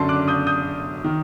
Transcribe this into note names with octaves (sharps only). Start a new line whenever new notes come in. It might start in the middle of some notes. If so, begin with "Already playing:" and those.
Already playing: F#2 D3 A5 C6
D6 F#6
D#6 G6
D#6 G6
D#3